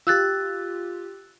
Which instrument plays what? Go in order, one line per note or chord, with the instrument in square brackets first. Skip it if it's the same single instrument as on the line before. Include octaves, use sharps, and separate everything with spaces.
[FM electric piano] F4 G4 [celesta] E6 F#6 A6